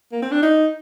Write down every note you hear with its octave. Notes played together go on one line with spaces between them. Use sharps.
A#3
C4
D4
D#4